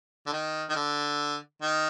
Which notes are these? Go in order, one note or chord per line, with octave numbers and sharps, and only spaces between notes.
D3
D#3
D#3
D3
D#3